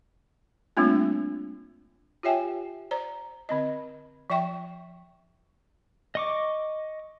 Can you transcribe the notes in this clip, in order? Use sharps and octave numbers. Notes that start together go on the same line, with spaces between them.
G3 A3 A#3 C4 D4 F4
F4 G4 C#5 E5 G5 G#5
C5 D5 A#5
D3 C4 D#5
F3 D5 E5 G5 C#6
D#5 C#6 D6